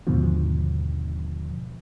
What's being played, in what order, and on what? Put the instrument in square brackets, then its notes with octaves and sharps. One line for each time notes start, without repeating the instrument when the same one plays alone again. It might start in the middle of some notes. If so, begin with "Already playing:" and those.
[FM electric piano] D#2 G#2 B2 D3 F3